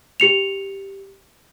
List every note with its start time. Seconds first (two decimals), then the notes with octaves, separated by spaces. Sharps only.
0.20 G4 C#7 F7